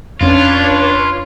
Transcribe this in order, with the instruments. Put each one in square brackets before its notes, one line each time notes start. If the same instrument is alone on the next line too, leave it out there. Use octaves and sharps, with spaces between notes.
[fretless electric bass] F2 C#4 [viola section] D4 B4 C#5 [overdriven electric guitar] F4